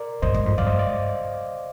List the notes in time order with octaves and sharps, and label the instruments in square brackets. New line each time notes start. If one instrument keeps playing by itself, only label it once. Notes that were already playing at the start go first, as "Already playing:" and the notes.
Already playing: [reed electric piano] A#4 D5
[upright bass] G2 [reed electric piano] C5 D#5
[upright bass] G#2
F2
[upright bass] G2 [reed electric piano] D5 F5
[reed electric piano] C5 D#5
D5